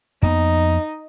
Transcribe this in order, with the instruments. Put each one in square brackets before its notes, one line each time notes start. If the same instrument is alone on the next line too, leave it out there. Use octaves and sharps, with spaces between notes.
[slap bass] F2 A#3 B3 [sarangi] D#4